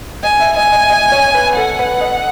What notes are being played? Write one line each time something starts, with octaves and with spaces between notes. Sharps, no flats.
D#5 G#5
E5
D#5 G#5
D#5
D#5
C#5
B4
A4 F#5
B4
D#5